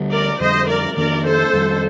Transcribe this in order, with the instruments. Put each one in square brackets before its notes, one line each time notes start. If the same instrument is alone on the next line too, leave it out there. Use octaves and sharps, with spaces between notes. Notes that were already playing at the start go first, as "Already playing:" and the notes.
Already playing: [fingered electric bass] D2 D3 G3
[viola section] A#4 D5
[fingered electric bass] F2 D3 G3 [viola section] C5 D#5
[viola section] A#4 D5
[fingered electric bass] F2 D#3 A#3 D4 [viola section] A#4 D5
[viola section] A4 C5
[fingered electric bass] F2 D#3 G3